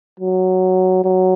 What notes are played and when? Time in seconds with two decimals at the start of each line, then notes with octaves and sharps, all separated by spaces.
0.19 F#3
1.04 F#3